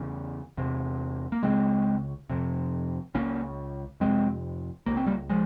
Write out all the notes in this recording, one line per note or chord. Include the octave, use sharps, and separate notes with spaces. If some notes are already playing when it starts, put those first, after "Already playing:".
Already playing: E2 C#3
E2 C3
A#3
C#2 C#3 G#3 C4
F2 C3
C#2 C#3 A#3 C#4
F2 C3 G#3 C4
C#2 C#3 A#3
C4
G3 A#3
F3 G#3